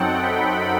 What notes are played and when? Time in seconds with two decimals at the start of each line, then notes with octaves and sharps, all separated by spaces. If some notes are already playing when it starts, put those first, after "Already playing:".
Already playing: F#2 F#3 C4 D#4 A4 F#5 G5
0.17 B5